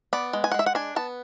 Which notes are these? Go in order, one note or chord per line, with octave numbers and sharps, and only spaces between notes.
B3 D5
G#3
G#5
F#5
G#3 E5
F#5
D4 G#5
B3 A5